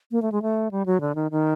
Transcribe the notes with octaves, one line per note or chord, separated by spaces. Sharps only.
A#3
A3
G#3
A3
G3
F#3
D3
D#3
D#3